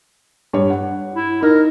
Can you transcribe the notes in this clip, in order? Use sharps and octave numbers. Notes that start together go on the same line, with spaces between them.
G2 C#5
F#5
E4
D#4 A#4